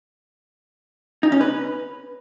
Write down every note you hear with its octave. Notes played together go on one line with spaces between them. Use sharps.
D#4
C#4
B4